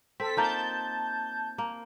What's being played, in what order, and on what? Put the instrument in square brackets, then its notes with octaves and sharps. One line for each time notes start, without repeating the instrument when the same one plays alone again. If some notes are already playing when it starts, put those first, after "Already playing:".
[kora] C4 [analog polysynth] A4 B6
[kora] A#3 D#4 F4 [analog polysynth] A5 G6
[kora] A#3